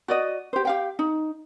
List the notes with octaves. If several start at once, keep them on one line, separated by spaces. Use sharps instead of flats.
F#4 D5 D#5
G4 C5
G4 F5 G5
D#4